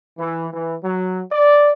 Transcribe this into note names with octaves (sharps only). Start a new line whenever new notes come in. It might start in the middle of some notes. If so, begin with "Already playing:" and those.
E3
E3
F#3
D5